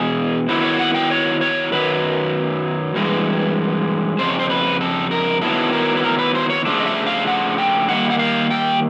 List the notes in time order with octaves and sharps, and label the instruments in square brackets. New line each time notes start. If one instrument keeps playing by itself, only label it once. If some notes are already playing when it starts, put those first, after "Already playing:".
Already playing: [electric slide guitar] E2 B2 G#3 G#4
D#3 F#3 B3 E4 C5
C#5
F#5
G5
C#5
C#5
F#2 D#3 F#3 B4
G2 E3 G#3
F2 C#3 C5
C#5
C5
B4
A4
A#4
D#3 F#3 B3 E4 A4
A#4
B4
A#4
B4
C5
C#5
C#3 F3 A3 D4
D#5
E5
F5
F#5
G5
D#3 G3 A#3 F#5
F#5
F5
G5